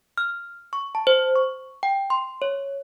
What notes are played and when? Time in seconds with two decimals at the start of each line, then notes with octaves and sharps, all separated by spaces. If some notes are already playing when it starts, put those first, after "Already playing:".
0.18 F6
0.73 C#6
0.95 A5
1.07 C5
1.36 C#6
1.83 G5
2.10 C6
2.42 C#5